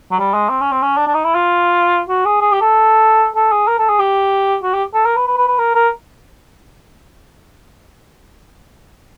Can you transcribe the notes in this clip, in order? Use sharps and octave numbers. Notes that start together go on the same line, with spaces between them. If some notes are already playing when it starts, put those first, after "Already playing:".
F#3
G3
G#3
C4
C#4
C4
C#4
D4
D4
D#4
E4
F4
F#4
G#4
G#4
G4
A4
A4
G#4
A#4
A4
G#4
G4
F#4
G4
A4
A#4
B4
B4
B4
B4
A#4
A#4